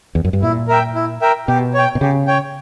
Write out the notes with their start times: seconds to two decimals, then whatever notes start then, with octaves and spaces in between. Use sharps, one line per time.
0.15 E2
0.25 F#2
0.33 G2
0.42 A#2 E4
0.68 A#4 E5 G5
0.95 E4
1.21 A#4 E5 G5
1.48 B2 G4
1.74 C#5 G5
1.95 B2
2.01 C#3 G4
2.27 C#5 G5